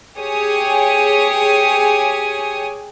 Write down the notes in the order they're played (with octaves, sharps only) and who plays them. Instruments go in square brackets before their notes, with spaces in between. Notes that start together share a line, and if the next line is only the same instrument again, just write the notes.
[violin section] G4 G#4 C#5 G#5 D#6